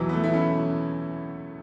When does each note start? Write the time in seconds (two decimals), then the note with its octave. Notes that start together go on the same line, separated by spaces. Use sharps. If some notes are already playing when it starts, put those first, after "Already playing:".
Already playing: E2 B2 E3 F#3
0.09 B3
0.13 A3
0.24 E4
0.33 C#4